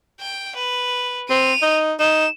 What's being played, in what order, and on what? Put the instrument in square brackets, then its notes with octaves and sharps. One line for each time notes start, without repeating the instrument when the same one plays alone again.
[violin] G5
B4
[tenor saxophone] C4 [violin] D#7 F7
[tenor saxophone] D#4
[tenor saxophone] D#4 [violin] E7